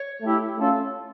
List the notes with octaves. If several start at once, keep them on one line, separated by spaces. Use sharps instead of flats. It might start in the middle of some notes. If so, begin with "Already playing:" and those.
Already playing: C#5
A3 E4 G4
A3 C#4 F4 A4